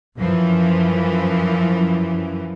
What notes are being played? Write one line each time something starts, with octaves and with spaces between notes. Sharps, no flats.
F#2 E3 F3